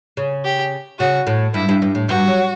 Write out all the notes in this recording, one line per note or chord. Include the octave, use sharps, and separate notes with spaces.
C#3
G4
C#3 F#4
A2
G2 E4
G2
G2
A2
G2 F#4
F#3